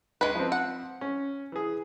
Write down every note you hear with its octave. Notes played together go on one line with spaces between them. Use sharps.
C#2 G#3 B4 F#6
F3 C4
F#5
C#4
E3 G#4